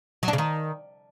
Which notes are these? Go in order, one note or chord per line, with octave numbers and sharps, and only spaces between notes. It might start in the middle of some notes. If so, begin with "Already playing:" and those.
F#3
D4
C#3
D#3